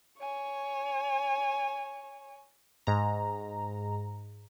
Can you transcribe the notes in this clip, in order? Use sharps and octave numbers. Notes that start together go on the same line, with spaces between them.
C#5 G#5
G#2 A#5